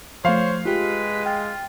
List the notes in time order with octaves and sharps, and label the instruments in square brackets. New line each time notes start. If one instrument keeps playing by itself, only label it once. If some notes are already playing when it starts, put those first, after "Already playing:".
[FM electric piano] F3 A3 [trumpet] C5 [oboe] C#5 [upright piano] F5
[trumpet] G#3 [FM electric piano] F4 G4 [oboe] B4
[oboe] F4 [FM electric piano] G5